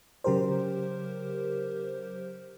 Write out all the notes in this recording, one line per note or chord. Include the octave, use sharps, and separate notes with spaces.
C#3 F#3 G4 A#4 C5